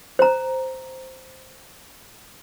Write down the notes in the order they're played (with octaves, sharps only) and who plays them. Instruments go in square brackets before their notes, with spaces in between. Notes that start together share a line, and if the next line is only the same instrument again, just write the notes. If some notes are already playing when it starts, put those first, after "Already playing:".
[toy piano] C5 A#5